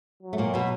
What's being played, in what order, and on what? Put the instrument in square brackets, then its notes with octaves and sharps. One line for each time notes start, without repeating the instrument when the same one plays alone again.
[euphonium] F#3
[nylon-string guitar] A3
A#2 A#3
B2 B3